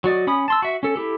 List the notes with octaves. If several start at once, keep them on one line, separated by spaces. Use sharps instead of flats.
F#3 F#4 D5 D#5
C#4 B5 D#6
A5 C6 E6
F#4 E5
C#4 A4
E4 G4 A4